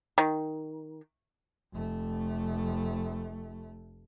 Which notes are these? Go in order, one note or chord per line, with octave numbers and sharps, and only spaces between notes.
D#3
F1 A3